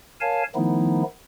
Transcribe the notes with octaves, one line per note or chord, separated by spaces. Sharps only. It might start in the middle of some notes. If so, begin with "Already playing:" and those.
A#4 C#5 F5 G#5 A5
D#3 F3 A3 B3 D#4 E4